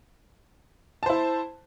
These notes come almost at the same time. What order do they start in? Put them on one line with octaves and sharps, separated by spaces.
A5 C5 E4